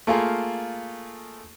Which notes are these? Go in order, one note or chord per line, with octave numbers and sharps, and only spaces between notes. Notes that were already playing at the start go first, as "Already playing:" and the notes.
A3 A#3 F4 G#4